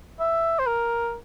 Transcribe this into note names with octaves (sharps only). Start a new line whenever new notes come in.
E5
C5
A#4